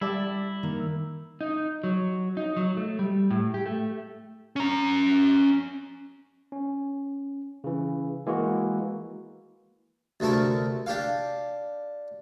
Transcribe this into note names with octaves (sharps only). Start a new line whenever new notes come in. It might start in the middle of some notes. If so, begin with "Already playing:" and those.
G3 E4 D5 A5
D#3 A#3
D#4
F#3
D#4
F#3
A3
G3
A2
G4
A3
C#4 A#5
C#4
C#3 E3
E3 G#3 A#3 F#4
D2 C3 A3 A4 A#4
D4 G4 F5